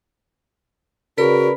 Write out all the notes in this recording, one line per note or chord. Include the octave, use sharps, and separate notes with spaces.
C#3 F#4 A#4 B4 D5 B5